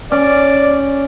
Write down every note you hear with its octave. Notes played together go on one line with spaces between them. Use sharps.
C#4 D5